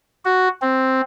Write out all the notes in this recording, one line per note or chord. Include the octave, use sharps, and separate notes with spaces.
F#4
C4